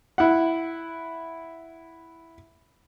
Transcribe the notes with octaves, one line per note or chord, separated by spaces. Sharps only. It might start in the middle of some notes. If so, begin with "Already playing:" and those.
E4 F#5